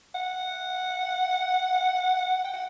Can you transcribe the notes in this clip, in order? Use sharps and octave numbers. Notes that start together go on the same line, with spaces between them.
F#5
G5
F#5